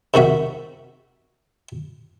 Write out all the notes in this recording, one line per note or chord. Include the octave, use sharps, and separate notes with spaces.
C3 D#3 F#4 E5